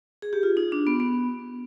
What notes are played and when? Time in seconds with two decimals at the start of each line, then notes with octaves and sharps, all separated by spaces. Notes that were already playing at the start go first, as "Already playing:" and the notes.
0.22 G#4
0.33 G4
0.43 F4
0.57 D#4
0.72 D4
0.87 B3
1.00 B3